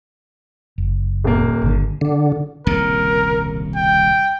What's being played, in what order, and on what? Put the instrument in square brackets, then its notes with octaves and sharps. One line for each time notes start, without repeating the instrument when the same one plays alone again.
[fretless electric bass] F#1
[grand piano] D#1 A#3
[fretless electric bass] G1 D3
[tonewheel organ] D3
[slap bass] D#1 C2 C#3 [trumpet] A#4
[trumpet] G5